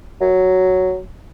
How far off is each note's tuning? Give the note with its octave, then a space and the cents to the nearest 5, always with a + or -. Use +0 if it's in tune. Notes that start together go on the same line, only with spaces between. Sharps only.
F#3 +5